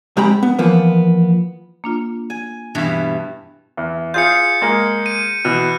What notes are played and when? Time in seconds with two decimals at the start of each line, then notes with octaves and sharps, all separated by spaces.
0.17 C3 G#3 G4 A#5 B5
0.43 B3
0.59 E3 F3 A#3 B3
1.84 A#3 D4 F4
2.30 G#5
2.75 G2 B2 E3
3.77 E2
4.14 F4 G#4 F5 G6 C#7
4.62 G#3 A#3 G#4
5.06 D#7
5.45 B2 E3 F#6